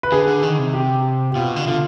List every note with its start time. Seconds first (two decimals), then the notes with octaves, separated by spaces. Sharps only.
0.03 B4
0.12 D3 G#4
0.28 D3
0.43 D#3
0.58 C3
0.73 G4
1.31 G4
1.35 B2 F4
1.56 D3
1.67 D3 F4